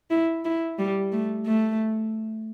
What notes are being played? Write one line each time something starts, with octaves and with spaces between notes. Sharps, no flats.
E4
E4
G3
A3
A3